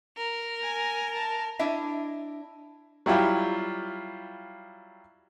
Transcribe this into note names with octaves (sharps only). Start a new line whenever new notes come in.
A#4
G#5
A5
D4 E4 D#5 E5
F#3 G3 E4 F4 G4